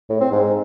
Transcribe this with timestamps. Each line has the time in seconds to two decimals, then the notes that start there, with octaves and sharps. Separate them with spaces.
0.10 A2
0.21 C4
0.32 G#2